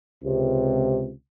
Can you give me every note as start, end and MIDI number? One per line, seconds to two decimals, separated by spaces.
0.24 1.10 37
0.24 1.10 48